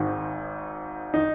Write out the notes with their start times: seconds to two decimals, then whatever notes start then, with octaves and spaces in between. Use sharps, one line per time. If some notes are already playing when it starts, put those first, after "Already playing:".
Already playing: G#1 G#2 D#3
1.14 D#3 D#4